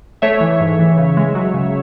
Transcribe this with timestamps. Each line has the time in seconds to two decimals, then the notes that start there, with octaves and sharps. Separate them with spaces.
0.22 A3 C#5 E5
0.40 E3
0.60 G#2
0.79 E3
0.97 C#3
1.17 G#3
1.35 F#3
1.54 C#3